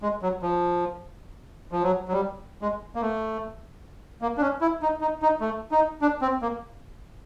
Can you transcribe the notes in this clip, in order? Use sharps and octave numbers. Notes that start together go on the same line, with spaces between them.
G#3
F#3
F3
F3
F#3
F#3
G3
G#3
A#3
A3
A#3
D4
C#4
E4
D#4
D#4
D#4
A3
D#4
D4
C4
A#3